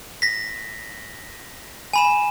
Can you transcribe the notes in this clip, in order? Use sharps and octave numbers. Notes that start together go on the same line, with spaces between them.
A#6 B6
G#5 B5 E7